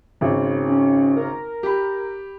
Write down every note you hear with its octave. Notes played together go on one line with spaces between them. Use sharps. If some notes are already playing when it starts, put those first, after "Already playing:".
G#1 C#3
C#4
A#4
G4 B5